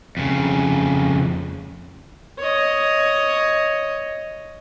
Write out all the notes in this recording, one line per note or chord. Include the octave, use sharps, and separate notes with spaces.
F2 C#3
C#5 D#5